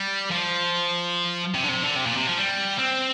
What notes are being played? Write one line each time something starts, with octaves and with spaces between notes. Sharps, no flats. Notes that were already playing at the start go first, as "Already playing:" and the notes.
Already playing: G3
F3
C3
D3
C3
D3
C3
A#2
C3
F3
G3
C4